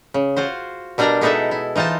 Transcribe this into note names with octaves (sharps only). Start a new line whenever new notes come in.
C#3
F4 F#4 C5
B2 G3 D4 A#4 D5 A#5
G#3 B3 D#4 E4 A4 E5
E4
E3 D#4 F4 C5 A5